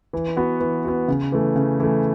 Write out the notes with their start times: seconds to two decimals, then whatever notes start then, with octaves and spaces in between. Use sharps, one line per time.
0.13 E3
0.37 B3 F#4
0.60 E3
0.85 B3 F#4
1.08 C#3
1.32 E3 A3
1.56 C#3
1.80 E3 A3